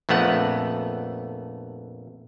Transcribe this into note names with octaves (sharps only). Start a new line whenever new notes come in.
A#1 F2 A3 B3 F#5